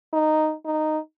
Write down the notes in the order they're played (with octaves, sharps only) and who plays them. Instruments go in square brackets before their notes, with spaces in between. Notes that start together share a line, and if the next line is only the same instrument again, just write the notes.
[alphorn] D#4
D#4